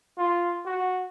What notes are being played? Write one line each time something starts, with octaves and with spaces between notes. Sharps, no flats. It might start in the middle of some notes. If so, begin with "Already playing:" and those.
F4
F#4